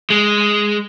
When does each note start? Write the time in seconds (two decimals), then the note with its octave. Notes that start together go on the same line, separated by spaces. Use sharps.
0.10 G#3